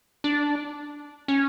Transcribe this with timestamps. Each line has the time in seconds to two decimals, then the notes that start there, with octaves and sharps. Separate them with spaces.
0.24 D4
1.28 C#4